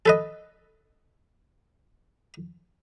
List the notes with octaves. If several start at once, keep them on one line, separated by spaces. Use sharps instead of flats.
A4 B4 D#5